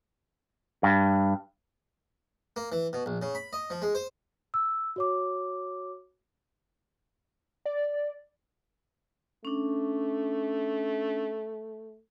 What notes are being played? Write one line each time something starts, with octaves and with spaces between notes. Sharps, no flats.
G2
A#3
E3
B2
A#1
C#3
B5
D#5
F3
G#3
C5
E6
F#4 C#5 D6
D5
A3 C#4 D4